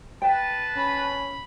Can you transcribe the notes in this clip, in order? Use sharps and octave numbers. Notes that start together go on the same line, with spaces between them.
B4 G5 A5
C#4 B5